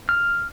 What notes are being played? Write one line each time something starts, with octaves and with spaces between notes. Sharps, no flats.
F6